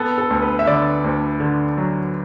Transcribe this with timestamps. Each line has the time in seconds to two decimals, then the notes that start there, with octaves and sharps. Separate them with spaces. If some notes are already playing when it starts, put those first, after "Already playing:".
Already playing: B3 A4
0.18 A4
0.30 D2
0.42 B4
0.59 E5
0.66 D3 D5
1.04 D2
1.40 D3
1.78 F#3